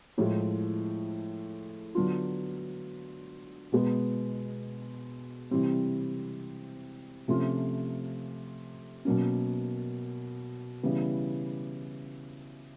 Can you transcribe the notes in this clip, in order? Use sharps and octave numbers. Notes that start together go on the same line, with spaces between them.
A2 F3 G#3
D3 F#3 B3 D4 F4
B2 G#3 B3
C3 E3 G3 C4
C3 F3 A3 C#4 F4
B2 F#3 A#3 C#4
C#3 E3 G3 B3 E4